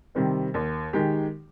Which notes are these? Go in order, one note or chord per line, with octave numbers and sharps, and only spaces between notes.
C3 D#3 G3 C4
D#2
D#3 G#3 D#4 G4